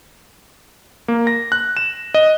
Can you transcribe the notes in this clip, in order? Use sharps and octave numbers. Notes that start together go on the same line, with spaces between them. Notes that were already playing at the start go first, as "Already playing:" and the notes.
A#3
A#6
F#6
E7
D#5